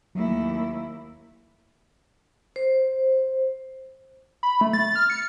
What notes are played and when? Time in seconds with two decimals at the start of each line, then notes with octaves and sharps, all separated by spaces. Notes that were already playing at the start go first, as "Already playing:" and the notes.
0.15 D#2 F#3 A3 E4
2.56 C5
4.43 B5
4.61 A3
4.73 A6
4.95 F6
5.10 C#7